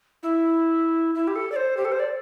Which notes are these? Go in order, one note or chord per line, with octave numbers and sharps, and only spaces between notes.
E4
E4
G4
A4
D5
C5
G4
A4
C5
D5